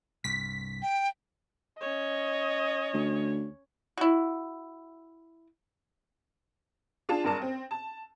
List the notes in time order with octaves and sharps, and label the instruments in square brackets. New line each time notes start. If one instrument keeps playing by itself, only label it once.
[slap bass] C2 G2 [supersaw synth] B6
[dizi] G5
[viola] C#4 C#5 [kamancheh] D#5
[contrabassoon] D2
[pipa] E4 F#4
[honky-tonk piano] D4 F4 G#4 A5
F#1 G2 A#4 D5 A5
C4
A5